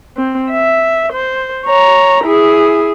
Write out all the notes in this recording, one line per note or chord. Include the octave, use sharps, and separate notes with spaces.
C4
E5
C5
C#5 A#5
E4 G#4